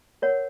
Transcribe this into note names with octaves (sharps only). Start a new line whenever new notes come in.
A#4 C#5 F#5